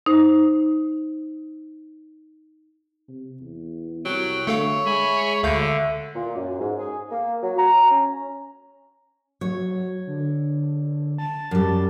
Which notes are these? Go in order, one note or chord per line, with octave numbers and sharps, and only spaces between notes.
D#4 C5
C3
E2
C2 F#3 G5
D3 A3 A4 C#5 F5
G#3 E5 G#5 B5
D2 D3 A3 F5 G6
A#2
F#2
G#2
G#4
A#3
F#3
A#5
C#4
F#3 C#5
D3
A5
F#2 G3